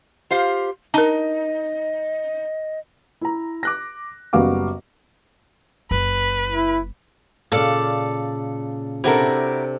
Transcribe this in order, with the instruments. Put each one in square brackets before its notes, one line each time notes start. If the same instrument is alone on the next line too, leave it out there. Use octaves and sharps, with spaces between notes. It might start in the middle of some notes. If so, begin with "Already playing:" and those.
[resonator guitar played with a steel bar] F4 C5 F5 [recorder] G4
[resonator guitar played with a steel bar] D#4 [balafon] A#4 A5 [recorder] D#5
[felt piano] E4 A#5
D6 F#6 A#6
F#1 G3 B3 F#4 F5 D6
[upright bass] F#1 [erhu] B4
[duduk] E4
[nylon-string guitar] A#2 C#3 [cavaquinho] A4 D5 F5
[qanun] C3 D4 A4 [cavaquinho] E4 F#4 A#4